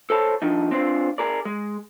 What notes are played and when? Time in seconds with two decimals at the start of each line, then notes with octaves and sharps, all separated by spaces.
0.10 A4 C5 C#5 A5
0.42 F3 D4 D#4
0.71 C4 D4 F4 C5
1.18 G#4 A#4 D5
1.45 G#3